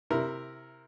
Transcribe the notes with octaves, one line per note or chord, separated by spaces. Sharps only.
C3 E4 A#4